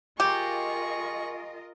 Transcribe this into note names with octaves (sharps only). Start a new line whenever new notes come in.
F4 G4 G#4 A#4 D#5 C#6